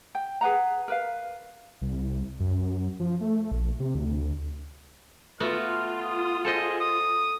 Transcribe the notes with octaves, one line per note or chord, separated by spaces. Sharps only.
G5
G#4 B4 F#5 A#5
A#4 B4 F5
C2
F#2
F3
A3
A#1
C3
D2
A3 B3 F4 F#4 F6
D#6
G#4 A4 C5 D#5
D#6